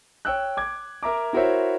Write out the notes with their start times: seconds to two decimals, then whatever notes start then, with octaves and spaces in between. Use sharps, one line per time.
0.25 C#5 G5 E6 F#6
0.57 D6 G#6
1.03 A#4 E5 A#5 D6
1.33 E4 F#4 A#4 C5 C#5 E5